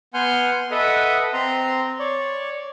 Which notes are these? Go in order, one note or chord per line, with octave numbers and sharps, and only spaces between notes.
B3 F#5 G#5 C6 F6 G6
A4 B4 D#5 E5 F#5
C4 A#5 C6
C#5 D5